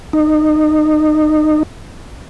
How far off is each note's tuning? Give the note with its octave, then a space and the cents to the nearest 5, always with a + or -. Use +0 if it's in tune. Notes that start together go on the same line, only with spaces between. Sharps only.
D#4 -25